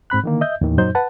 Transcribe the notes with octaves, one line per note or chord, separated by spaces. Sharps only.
G#2 C4 B5 F#6
D3 D#3 A#3
D#5 E5 G6
D#2 A2 D#3 E3
F#2 A#2 F#3 D#4 C5 G6
B4 F#5 A5